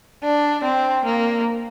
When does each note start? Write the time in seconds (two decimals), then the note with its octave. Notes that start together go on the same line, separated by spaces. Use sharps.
0.23 D4
0.64 C4
1.05 A#3